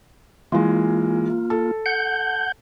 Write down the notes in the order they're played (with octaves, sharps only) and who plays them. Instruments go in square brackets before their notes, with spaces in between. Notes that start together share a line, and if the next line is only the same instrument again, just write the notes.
[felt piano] E3 G#3 [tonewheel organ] A#3 F4
[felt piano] A4
[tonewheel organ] F#5 G6